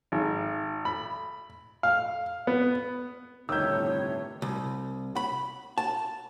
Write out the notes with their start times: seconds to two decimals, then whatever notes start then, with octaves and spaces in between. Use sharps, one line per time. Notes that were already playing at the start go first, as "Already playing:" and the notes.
0.12 G#1
0.85 B5
1.83 F5
2.47 B3
3.49 G1 A2 C3 D#3 D#4 C#5 E6 G6
4.42 C2
5.16 B5
5.78 A5